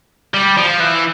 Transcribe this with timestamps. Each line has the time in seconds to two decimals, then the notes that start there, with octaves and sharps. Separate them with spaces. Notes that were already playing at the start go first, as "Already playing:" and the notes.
0.34 G3
0.57 F3
0.80 E3